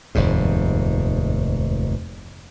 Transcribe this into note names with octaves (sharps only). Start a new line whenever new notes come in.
F1 D#2 G#2